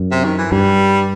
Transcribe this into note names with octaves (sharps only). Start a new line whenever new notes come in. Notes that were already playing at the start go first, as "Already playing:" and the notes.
Already playing: F#2
C3
D#3
E3
G2 G3